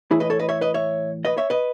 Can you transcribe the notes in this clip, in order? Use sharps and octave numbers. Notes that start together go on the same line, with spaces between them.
A2 E3 E4 G#4
B4 D#5
A4 C#5
B4 D#5
C#5 E5
B4 D#5
C#5 E5
B4 D#5
C#5 E5
B4 D#5